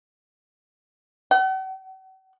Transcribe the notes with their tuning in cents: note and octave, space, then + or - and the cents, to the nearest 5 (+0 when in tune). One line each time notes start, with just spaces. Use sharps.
F#5 +45